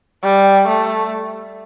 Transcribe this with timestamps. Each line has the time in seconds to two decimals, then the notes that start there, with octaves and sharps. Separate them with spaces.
0.23 G3
0.68 A3